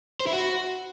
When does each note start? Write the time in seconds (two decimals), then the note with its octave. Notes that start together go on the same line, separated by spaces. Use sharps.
0.20 C5
0.27 E4
0.33 F#4